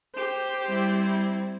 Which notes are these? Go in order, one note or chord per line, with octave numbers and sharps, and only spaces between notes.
G4 C5
G3 C4 E4